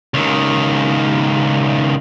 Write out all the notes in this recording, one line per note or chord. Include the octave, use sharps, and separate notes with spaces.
C#2 D#3